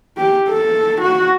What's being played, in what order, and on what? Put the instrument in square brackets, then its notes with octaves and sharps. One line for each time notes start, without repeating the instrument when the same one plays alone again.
[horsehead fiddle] G4
A4
F#4